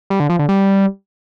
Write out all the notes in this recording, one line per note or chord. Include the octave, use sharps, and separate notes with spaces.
G3
D3
F3
D3
G3